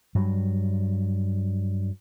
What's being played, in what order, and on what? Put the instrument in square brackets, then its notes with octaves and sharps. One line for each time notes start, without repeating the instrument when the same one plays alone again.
[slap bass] G2 F#3